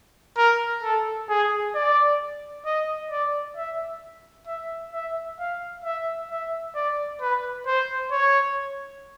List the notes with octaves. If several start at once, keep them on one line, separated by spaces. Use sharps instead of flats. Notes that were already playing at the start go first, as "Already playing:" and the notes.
A#4
A4
G#4
D5
D#5
D5
E5
E5
E5
F5
E5
E5
D5
B4
C5
C#5